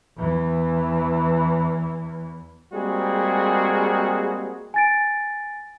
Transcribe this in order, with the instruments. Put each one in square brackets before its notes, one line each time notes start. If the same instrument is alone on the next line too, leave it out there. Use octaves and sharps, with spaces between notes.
[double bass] E2 E3
[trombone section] G3 G#3 A#3 C4 F#4 G#4
[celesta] G#5 A6 D7